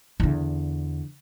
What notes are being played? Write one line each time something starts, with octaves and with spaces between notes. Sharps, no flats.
E2 D3